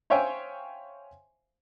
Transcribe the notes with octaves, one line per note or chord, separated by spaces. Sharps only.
C5 C#5 E5 F5 G5 G#5